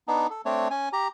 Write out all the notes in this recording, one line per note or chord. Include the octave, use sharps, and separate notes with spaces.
B3 D4 D#4
A4
A3 C4 D4 C#5
C#4 G#5
G4 A#5